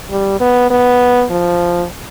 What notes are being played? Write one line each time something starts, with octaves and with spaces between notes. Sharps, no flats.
G3
B3
B3
F3